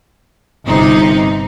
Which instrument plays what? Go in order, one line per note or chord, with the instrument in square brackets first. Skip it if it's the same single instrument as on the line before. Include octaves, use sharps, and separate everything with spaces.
[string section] G1 C3 D#4